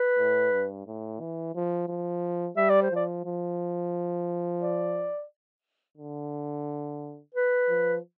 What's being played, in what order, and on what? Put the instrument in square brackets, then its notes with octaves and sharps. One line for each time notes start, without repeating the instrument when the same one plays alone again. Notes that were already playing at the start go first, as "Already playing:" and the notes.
Already playing: [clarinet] B4
[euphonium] A2
G2
A2
E3
F3
F3
[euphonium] G3 [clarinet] E5
[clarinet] D5
C5
[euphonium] F3 [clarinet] D5
[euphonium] F3
[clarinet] D5
[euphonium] D3
[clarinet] B4
[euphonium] F3